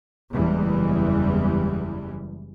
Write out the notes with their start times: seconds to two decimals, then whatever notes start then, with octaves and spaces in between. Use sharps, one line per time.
0.34 F#1 E2 E3 G3 G#3